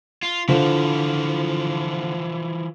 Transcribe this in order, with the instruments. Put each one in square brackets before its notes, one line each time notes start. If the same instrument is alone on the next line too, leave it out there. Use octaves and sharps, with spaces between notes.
[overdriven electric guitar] F4
[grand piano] D3 F4 C5 [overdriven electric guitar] E3 F3